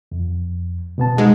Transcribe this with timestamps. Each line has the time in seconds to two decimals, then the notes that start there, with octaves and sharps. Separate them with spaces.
0.12 F2
0.98 B2 B3 A5
1.18 G#2 G#3 D#6